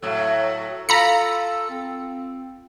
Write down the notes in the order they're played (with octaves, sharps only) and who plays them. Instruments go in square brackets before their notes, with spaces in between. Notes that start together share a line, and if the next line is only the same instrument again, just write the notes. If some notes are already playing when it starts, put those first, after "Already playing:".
[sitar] A2 F#3 [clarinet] A4
[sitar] F4 [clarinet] A4 [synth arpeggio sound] A#5 B5 C#7
[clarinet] C4